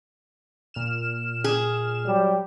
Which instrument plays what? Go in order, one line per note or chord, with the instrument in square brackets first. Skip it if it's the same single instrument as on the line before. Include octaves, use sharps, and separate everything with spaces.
[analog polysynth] A#2 F6 E7
[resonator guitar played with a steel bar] G#4
[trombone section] F#3 G3 G4